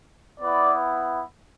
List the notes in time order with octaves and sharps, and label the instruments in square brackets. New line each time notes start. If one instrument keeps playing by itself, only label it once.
[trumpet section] B3 E4 B4 D5